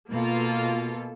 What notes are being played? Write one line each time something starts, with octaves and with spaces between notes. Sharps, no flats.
B2 A#3 F4 A4